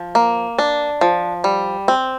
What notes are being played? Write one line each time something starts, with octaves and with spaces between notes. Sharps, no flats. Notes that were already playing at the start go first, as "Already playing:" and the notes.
Already playing: F3
A#3
D4
F3
G3
C4